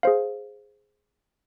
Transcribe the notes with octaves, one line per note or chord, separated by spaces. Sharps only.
G#4 C5 F5